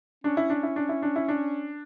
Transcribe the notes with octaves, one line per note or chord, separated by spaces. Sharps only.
C#4 D4
E4
D4
E4
D4
E4
D4
E4
D4